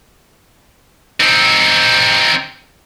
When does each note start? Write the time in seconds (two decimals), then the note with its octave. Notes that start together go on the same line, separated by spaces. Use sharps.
1.20 C4 D#4